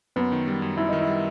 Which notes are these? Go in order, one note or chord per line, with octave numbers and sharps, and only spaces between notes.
F#2 B3
D#3
G3
F#2
F#2 E4
D#3 D#4
E4
G3